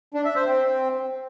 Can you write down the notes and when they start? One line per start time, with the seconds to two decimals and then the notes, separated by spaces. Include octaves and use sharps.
0.14 D4
0.25 E5
0.36 C5
0.47 C4